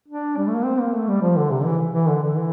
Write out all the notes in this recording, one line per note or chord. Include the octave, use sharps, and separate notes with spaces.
D4
G3
A3
A#3
C4
A#3
A3
G3
F3
D3
C3
E3
E3
D3
D3
E3